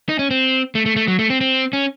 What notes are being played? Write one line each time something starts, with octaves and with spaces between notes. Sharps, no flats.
D#4
C#4
C4
A3
A3
A3
F#3
A3
C4
C4
C#4